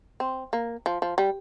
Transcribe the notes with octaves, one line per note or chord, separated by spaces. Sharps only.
C4
A#3
F3
F3
G3